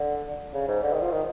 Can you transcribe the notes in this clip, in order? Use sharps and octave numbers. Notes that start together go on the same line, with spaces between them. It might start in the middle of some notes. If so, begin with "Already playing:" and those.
Already playing: D3
C#3
G#2
D3
D#3
F3
D#3